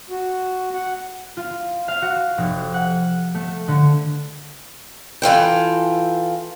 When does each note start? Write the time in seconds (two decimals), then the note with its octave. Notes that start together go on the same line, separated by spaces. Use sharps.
0.10 F#4
0.75 F#5
1.37 F4
1.88 F5
2.02 F#4
2.38 F1
2.74 F#5
3.35 A3
3.68 D3
5.22 E3 F4 A4 G5